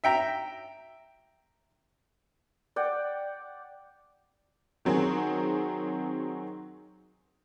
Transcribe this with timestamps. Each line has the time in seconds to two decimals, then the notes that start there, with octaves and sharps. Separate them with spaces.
0.04 E5 G5 A#5
2.76 D5 F#5 G5
4.85 D#3 F#3 C4 G#4